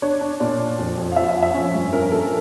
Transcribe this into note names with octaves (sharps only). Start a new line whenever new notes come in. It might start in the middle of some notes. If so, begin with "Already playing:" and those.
D4 C#5
D4
A#2 D5
D4
F2
F2
F5
F3 E5
E5
F2
E5
C#4
G2
C#4 A#4
A#3 A4